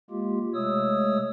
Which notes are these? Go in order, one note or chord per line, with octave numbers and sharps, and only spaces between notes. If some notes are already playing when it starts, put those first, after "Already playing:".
G#3 A#3 F4 G4
C3 G#3 A3 C#5 D#6 E6